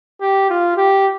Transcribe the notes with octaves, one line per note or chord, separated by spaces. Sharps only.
G4
F4
G4